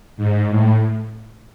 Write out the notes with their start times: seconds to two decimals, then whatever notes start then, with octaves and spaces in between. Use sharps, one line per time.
0.17 G#2
0.50 A2